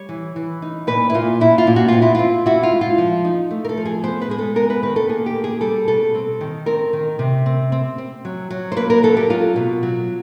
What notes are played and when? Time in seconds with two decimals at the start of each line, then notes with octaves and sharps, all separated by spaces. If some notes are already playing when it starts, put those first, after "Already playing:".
Already playing: G3 C#5
0.09 E3
0.36 E3
0.62 D#4
0.87 A#2 B4
1.10 E4
1.14 A#2 F4
1.40 A#2 E4
1.58 F4
1.67 A#2
1.76 F#4
1.88 C4 F4
2.02 E4
2.15 C4 F4
2.46 E4 F#4
2.63 F4
2.72 G#3
2.81 F4
2.98 F3
3.25 D#4
3.51 A3
3.65 A#4
3.69 A4
3.77 F3
3.85 G#4
4.04 B3 C5
4.21 B4
4.29 G#3 G#4
4.39 A4
4.56 B3 A#4
4.70 B4
4.82 D#3 B4
4.96 A4
5.09 A#3 G#4
5.26 G4
5.35 A#3
5.44 G#4
5.61 G3 A4
5.88 B2 A4
6.15 C4
6.41 D#3
6.66 C4 A#4
6.93 D#3
7.19 C3
7.46 C4
7.72 C4
7.98 C4
8.25 F#3
8.50 F#3
8.72 C5
8.76 A#3 B4
8.90 A#4
9.03 F#3 A4
9.17 G4
9.30 F#3 F4
9.56 B2
9.83 F#3